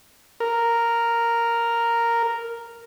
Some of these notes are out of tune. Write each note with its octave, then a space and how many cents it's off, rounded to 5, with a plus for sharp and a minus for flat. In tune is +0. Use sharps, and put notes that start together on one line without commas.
A#4 -5